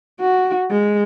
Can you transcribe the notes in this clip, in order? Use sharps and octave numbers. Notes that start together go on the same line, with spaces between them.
F#4
G#3